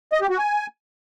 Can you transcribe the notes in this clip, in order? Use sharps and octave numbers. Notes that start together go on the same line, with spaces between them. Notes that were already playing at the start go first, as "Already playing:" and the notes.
D#5
G4
F#4
G#5